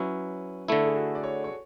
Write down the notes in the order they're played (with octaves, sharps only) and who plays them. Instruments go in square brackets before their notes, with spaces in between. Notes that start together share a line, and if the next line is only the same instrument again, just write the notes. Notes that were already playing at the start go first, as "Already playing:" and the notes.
Already playing: [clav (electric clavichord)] F#3 C#4 E4 [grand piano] B4
[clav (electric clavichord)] D3 A3 E4 [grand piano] A4
[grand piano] G#4
F#4
D5
C#5
C#5